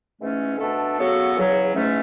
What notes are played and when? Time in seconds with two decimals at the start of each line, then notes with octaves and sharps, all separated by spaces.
0.21 G#2 E3 A3 C#4
0.58 B2 A3 D4 A4
0.98 C#3 F#3 B3 F#4 A4
1.36 E2 C#3 F#3
1.74 G#2 E3 A3 C#4